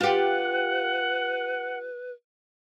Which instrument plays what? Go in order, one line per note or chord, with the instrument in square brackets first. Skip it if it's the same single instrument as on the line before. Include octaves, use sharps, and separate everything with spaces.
[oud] F4 G4 [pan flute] B4 [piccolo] F#5